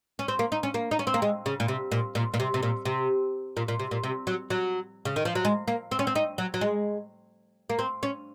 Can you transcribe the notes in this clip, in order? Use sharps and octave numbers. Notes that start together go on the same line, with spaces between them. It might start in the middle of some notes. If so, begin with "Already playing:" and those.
C#4
C4
A#3
D#4
C#4
A#3
D#4
C#4
C4
A#3
G#3
C#3
A#2
C3
A#2
A#2
A#2
C3
C3
A#2
C3
A#2
A#2
C3
A#2
C3
F#3
F#3
C#3
D#3
F3
F#3
G#3
A#3
C4
C#4
C4
D#4
F#3
F#3
G#3
A#3
C4
C#4